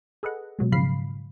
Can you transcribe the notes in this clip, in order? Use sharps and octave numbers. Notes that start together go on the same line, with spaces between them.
G#4 A4 B4 D#5 F#5
B2 F#3 G#3
G#2 C#3 F3 F5 B5 C7